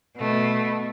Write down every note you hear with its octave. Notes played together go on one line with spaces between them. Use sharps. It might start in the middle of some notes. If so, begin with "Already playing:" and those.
B2 A3